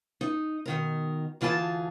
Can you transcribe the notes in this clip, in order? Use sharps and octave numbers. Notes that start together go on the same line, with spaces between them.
D#4
B2 D#3 A#4
D2 E3 F4 G#4 A5